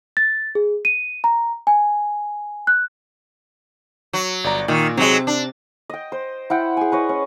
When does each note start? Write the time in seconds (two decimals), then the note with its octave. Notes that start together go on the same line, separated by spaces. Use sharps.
0.17 A6
0.55 G#4
0.85 D#7
1.24 A#5
1.67 G#5
2.67 F#6
4.13 F#3
4.44 G1 D5 A#5
4.68 A#2 D#3 C#6
4.97 C3 F#3 G#3 C4
5.27 D4
5.89 D#5 G5
6.12 C5
6.50 E4 F#5 G5
6.77 G#4 G#5
6.92 B4 C#5 D#5
7.09 C#4